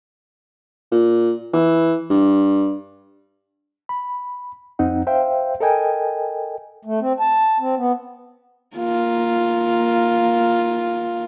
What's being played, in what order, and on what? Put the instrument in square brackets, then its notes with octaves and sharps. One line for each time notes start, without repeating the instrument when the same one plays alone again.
[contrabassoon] A#2
E3
G2
[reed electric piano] B5
F2 C4 D#4 F#5
C5 E5 F5 G5
A4 A#4 D#5 G5 G#5
[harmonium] A3
C4
A5
C4
B3
[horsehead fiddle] A#3 F4